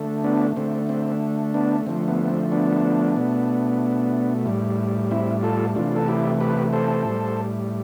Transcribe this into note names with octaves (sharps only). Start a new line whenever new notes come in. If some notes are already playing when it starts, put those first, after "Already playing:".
Already playing: D3 A3
B3 D4
D3 A3 C4
C4
B3 D4
D3 F3 A3 C4
B3
B3
C4
B3 D4
B2 A3
A2 G3
C4 E4
F4 A4
C3 E3 A3 D4 F4
A4
E4 G4
G4 B4
A4 C5
A2 G3